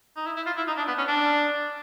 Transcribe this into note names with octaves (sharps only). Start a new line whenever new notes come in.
D#4
E4
E4
F4
E4
D#4
D4
B3
C#4
D4